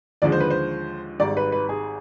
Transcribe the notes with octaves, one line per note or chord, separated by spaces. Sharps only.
D#2 D3 F3 G#3 D5
C5
B4
C5
G#1 G#2 G3 D5
B4
B4
G#4